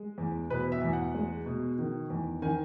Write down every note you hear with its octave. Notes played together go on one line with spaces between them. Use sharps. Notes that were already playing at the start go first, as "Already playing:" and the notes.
Already playing: G#3
E2
B2 B4
E5
E2
F#5
G#3
B2
D#3
E2
D#3 G#5